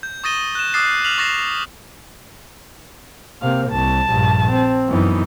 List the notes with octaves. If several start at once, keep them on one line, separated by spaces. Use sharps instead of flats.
G6
C#6 D#6 A6 A#6 D#7 G7
F#6 E7
D6 D#6 F6 F#6 A6 C7
F6 B6 F7 F#7
C#6 A6 A#6 C7
C3 A#3 F5
C2 A5
A#1 G2
C4
F#2 E3 B3 D#4